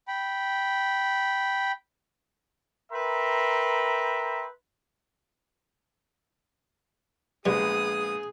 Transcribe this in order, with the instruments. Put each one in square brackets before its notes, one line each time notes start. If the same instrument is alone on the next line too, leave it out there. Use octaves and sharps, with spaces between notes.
[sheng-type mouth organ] G5 B5
[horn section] A#4 B4 E5 G5 A#5 C6
[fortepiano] A#1 G#3 B3 [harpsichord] G3 [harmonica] G#4 [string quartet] D#6